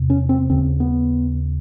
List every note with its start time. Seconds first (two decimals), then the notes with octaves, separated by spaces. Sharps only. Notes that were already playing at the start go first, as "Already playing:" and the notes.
Already playing: E2 C3
0.10 C#4
0.29 C4
0.50 D#2 C#3 C4
0.80 B3